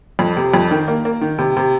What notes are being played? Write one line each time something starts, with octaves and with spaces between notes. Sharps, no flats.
F2
C3
F2
D#3
A#3
A#3
D#3
C3
C3